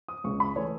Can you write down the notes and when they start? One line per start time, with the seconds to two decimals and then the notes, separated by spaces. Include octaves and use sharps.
0.08 D#6
0.24 C#2 C#3 G#3 C#6
0.40 B5
0.56 E3 A3 C#5